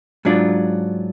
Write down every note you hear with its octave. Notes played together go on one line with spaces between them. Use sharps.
G#2 F#3 D4 F4